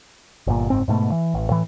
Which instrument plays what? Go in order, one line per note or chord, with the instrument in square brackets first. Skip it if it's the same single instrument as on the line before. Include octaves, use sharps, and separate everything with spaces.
[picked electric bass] G1 A#2
F#1 G#2 C4
G#2 B2 A3
E3
A1
A2 E3